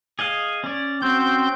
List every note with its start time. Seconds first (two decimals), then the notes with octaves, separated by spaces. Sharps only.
0.19 G#4 D#5 F5
0.64 C#4 D5
1.02 C4 C#4 F#4 G6